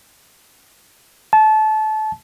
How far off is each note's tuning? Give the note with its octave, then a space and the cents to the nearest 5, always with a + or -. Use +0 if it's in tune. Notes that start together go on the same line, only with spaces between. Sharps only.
A5 -25